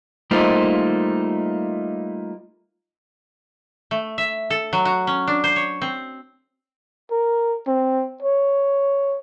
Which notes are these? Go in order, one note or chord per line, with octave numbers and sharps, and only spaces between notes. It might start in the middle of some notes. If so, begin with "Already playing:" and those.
G3 A3 A#3 D#4 F4 C5
A3
E5
A4
F#3
F#4
C#4
D4
C5
C#5
C4
A#4
C4
C#5